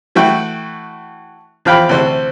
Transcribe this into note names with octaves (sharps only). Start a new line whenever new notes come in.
E3 A3 F#4 G5
E2 F3 F5 G5 B5
D2 C3 E3 C5